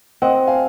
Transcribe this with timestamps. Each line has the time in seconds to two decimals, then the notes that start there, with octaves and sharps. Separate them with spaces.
0.22 C4 D#5 F#5
0.47 F5 G#5